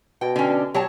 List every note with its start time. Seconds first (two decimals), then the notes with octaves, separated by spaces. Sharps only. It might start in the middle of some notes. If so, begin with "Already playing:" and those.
0.21 B2 G5
0.36 D3 C#4
0.74 F#3 G4 C#5 A5